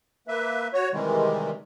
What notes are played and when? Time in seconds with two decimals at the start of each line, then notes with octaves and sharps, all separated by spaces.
0.28 A#3 B4 E5
0.73 F#4 C#5
0.92 C3 D#3 E3 G3 G#3